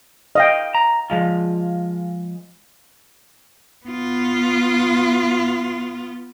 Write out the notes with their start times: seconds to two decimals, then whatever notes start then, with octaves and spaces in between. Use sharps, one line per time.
0.35 D#5 F5 G5
0.75 A#5
1.10 F3 G#3 F4
3.86 B3 F4